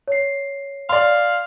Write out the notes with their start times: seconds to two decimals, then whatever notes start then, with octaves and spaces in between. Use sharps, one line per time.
0.08 C#5 C7
0.89 D5 F5 C6